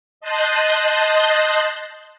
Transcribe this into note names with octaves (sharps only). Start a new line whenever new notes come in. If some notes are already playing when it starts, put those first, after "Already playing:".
D#5 A5 C6 D#6 F#6 G6